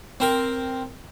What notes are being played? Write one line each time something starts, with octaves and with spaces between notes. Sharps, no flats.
C4 A#4